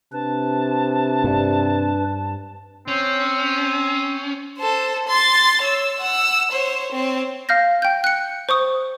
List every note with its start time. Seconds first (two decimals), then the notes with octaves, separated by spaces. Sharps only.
0.12 C3 D4 B4 A5
1.24 G2
2.88 C4 C#4
4.58 A4 C5
5.08 C6 A6
5.62 C#5 E6
6.00 F#5 E6
6.51 C5 C#5
6.92 C4 C#5
7.49 F5 F6 G6 A#6
7.82 G5 G6
8.04 F#6 C#7
8.49 C5 C#6 D#6